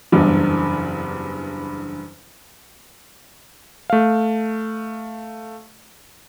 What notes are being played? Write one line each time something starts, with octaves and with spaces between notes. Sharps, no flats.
F#1 E2 G2
A3 F5